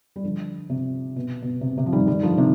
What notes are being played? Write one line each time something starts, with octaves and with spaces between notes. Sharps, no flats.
G3
D3 F3
C3
B2
B2
C3
C3
F3
D#3 G3
D#3 G3
D3 F3
C3 D#3